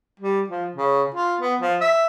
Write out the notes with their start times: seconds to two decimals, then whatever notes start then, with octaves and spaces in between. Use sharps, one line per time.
0.20 G3
0.48 F3
0.76 C#3
1.14 F4
1.41 B3
1.60 F3
1.81 E5